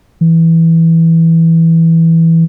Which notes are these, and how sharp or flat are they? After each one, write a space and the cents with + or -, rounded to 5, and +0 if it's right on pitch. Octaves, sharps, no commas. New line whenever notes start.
E3 -5